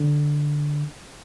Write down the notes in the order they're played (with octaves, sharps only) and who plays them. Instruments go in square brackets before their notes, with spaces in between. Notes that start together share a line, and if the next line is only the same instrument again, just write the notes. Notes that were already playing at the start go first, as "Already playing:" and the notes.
Already playing: [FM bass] D3